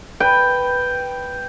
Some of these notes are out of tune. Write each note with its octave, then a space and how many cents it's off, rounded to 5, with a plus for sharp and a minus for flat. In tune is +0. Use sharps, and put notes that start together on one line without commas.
B4 +0 G5 +0